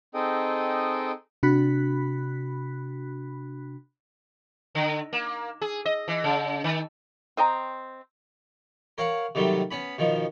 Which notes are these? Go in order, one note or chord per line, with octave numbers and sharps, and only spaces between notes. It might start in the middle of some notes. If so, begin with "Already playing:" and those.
C4 D#4 G#4 A4 D#5 G5
C3 D4 F#4 B5 F#6 B6
D3
A#3
G#4
D#5
E3
C#3
D#3
C4 D#5 G5 A#5
A#4 C#5 F5 F#5
C3 D#3 F#3 G3 A3
B3 C#4 B5
B2 D#3 F3